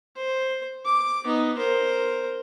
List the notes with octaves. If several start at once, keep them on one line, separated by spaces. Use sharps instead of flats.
C5
D6
B3 D#4
A#4 C5